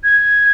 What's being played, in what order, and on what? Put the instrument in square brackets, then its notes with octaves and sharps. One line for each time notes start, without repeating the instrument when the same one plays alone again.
[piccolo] G#6